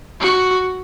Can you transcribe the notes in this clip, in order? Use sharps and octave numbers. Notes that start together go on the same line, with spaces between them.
F#4